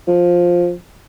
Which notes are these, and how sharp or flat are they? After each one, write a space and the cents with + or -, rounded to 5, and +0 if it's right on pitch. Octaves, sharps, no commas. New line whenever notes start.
F3 +10